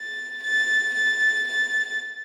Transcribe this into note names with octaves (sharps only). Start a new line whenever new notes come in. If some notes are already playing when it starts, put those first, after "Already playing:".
Already playing: A6
A6
A6
A6